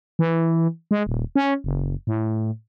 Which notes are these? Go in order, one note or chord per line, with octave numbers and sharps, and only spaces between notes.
E3
G#3
D#1
C#4
F#1
A2